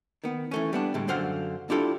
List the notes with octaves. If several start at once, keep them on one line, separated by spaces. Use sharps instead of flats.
D#3 B3
E3 A3 C#4
G3 B3 D4
A2 D3 G3 G#3
F#2 D3 C5 F5 F#5
D4 E4 F4 G4 A4 G5